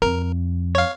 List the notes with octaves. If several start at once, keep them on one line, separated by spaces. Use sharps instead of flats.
F2 A#4
C#5 F5